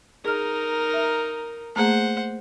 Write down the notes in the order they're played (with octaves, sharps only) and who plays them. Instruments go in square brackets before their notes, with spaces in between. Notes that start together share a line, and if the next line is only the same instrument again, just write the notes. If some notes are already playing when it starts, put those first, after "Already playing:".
[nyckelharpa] D#4 A#4 [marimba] G#4 F6
[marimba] E5
[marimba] A3 A#3 G#4 [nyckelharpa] C5 F#5